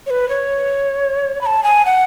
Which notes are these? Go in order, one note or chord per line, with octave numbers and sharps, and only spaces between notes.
C#5
B4
C#5
B5
A5
G#5
F#5